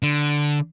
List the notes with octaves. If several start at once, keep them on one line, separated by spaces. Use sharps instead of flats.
D3